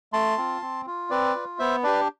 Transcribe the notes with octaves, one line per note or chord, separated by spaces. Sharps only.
A3 A5 C6
C4 F4
C4
F4
C4 B4 D5
F4
B3 C5 E5
D4 G4 B4 D5